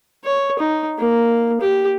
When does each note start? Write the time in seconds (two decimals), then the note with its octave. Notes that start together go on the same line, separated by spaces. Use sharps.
0.24 C#5
0.59 D#4
0.98 A#3
1.61 G4